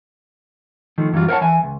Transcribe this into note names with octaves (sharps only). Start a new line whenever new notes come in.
D#3 F3 A3
F#2 E3 F#3 G3 F4
A#4 C5 C#5 F5 F#5 A5
E3 E5 G#5
C#2